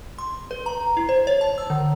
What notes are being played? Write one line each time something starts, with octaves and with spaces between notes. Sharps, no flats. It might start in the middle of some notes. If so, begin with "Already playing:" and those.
C6
B4
A#5
E4
C5
C#5
A5
E6
D3